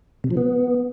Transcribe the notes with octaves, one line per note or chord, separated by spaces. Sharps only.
C3
F3
B3